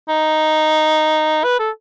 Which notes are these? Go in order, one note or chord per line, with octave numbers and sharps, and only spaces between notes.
D#4
B4
A4